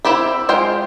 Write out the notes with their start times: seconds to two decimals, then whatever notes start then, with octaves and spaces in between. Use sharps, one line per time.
0.05 C4 E4 G4 E5
0.49 G#3 F4 C5 G5